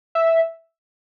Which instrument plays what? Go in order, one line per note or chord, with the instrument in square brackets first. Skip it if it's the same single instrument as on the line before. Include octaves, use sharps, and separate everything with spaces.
[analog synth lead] E5